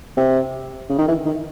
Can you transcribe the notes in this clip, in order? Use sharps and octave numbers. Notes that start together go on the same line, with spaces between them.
C3
C#3
D#3
E3
D#3